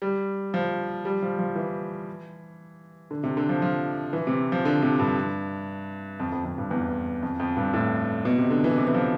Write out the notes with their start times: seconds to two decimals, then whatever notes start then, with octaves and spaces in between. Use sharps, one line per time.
0.02 G3
0.54 F3
1.05 G3
1.22 F3
1.39 F3
1.56 E3
3.11 D3
3.24 C3
3.37 D3
3.49 F3
3.62 F3
4.13 E3
4.27 C3
4.52 F3
4.65 D3
4.82 C3
4.99 G2
6.20 F2
6.32 F2
6.45 F2
6.58 G2
6.71 E2
7.22 F2
7.40 F2
7.57 G2
7.73 A2
8.25 B2
8.38 C3
8.50 D3
8.64 E3
8.77 C3
8.87 E3
8.94 F3